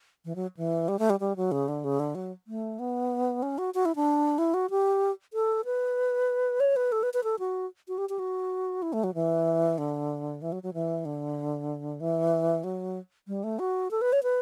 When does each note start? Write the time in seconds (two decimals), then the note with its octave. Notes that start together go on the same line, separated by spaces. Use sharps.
0.25 E3
0.36 F#3
0.57 E3
0.88 G3
0.99 A3
1.10 G3
1.20 G3
1.36 F#3
1.52 C#3
1.68 D3
1.84 C#3
1.99 D3
2.15 F#3
2.47 A3
2.79 B3
3.43 C#4
3.58 F#4
3.74 F#4
3.85 E4
3.96 D4
4.38 E4
4.54 F#4
4.70 G4
5.33 A4
5.65 B4
6.60 C#5
6.76 B4
6.92 A4
7.03 B4
7.14 B4
7.24 A4
7.39 F#4
7.88 F#4
7.98 G4
8.09 G4
8.19 F#4
8.82 E4
8.93 A3
9.04 F#3
9.14 E3
9.78 D3
10.42 E3
10.52 F#3
10.63 F#3
10.74 E3
11.05 D3
12.00 E3
12.64 F#3
13.28 G3
13.44 A3
13.59 F#4
13.91 A4
14.01 B4
14.13 C#5
14.23 B4